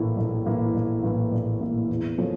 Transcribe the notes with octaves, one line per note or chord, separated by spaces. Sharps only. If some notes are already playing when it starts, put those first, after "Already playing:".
Already playing: A#1 A2 E3 A#3 E4
A#1
A2 E3 A#3 E4
A#1
A2 E3 A#3 E4
A#1
A2 E3 A#3 E4
E2
C#3 F3 A3 C#4